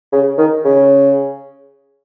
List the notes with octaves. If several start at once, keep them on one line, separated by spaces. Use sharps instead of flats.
C#3
D#3
C#3